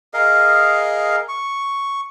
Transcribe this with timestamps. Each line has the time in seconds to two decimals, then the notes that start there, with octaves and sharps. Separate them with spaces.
0.14 G#4 A#4 D#5 F5
1.29 C#6